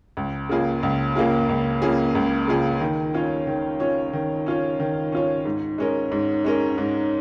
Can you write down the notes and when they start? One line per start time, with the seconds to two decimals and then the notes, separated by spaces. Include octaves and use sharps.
0.17 C#2
0.49 C#3 A#3 F4 G#4
0.83 C#2
1.16 C#3 A#3 F4 G#4
1.49 C#2
1.82 C#3 A#3 F4 G#4
2.15 C#2
2.48 C#3 A#3 F4 G#4
2.81 D#3
3.14 C#4 F4 C#5
3.47 D#3
3.80 C#4 F4 C#5
4.13 D#3
4.46 C#4 F4 C#5
4.80 D#3
5.12 C#4 F4 C#5
5.45 G#2
5.78 G#3 C#4 A#4
6.12 G#2
6.45 G#3 C#4 A#4
6.78 G#2